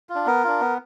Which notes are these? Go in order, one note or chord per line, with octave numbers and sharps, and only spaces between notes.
F4
D4
B3 A#4
D4 F4
B3